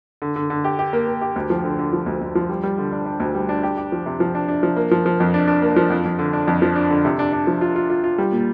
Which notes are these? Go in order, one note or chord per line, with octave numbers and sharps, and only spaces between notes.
D3
D3
D3
G4
G4
A#3
A#3
G4
D2
F3
D3
D3
F3
D2
D2
F3
G3
G3
D3
D4
D4
D2
G3
D4
G4
G4
F3
C3
F3
D4
D4
F3
A#3
F3
F3
F2
D4
D4
A#3
F3
F2
F2
D3
D4
F2
F3
D4
D3
C3
D4
D4
F3
F4
F4
F4
F4
G3
A#2